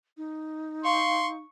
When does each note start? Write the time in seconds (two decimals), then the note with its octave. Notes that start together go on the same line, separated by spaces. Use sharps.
0.17 D#4
0.85 F5 C6 C#6